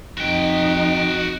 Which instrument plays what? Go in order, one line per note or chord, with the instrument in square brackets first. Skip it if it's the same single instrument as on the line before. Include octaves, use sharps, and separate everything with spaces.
[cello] F2 D#4 [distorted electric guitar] F#4 G5